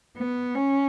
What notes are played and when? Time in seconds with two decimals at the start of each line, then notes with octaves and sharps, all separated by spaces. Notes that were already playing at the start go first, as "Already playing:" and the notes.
0.17 B3
0.55 C#4